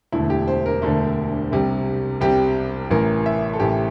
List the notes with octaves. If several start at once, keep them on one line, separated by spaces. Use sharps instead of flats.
E1 D2 D3 A3 E4
G4
C5
A#4
E1 D2 D3 A3
C2 C3 G3
C2 C3 G3 G4
A1 A2 E3 A#4
E5
A4
A1 A2 E3 G4